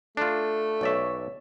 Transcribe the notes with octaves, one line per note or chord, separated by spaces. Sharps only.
A3 D4 F4
B1 C#5 D5 E5